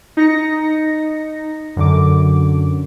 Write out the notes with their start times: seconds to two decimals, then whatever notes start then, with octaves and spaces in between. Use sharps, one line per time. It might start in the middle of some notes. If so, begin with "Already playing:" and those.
0.17 D#4 A#6 C#7
1.76 F#2 D3 D6